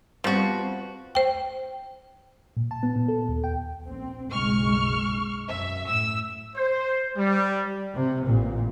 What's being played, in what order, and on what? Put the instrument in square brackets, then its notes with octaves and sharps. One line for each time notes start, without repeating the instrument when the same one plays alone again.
[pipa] F3 F#4 [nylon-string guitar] G3 B3 C4
[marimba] C5 G5
[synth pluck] A#2
A5
B3
A#2
A4
D#2
G5
[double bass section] A#1 C4
[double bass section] F#1 B1 G#3 [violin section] C#6 F6
[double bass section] F#2 [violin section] E5
[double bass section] A2 [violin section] E6
[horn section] C5
G3
[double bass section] C3
A1 A#2